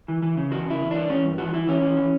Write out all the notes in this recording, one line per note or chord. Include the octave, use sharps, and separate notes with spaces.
E3
E3
C#3
E2 F#4
C#3 E4
E2
E3 D4
E3 C#4
G2
E3 F#4
E3 E4
E3 C#4
E3
E3